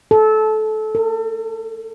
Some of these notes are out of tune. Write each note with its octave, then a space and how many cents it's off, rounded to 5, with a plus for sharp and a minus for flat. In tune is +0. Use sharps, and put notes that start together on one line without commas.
A4 -20
A4 +40